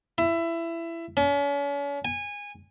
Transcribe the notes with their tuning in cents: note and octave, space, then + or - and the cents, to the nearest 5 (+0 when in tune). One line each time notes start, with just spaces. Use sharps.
E4 +20
C#4 +40
G#5 -20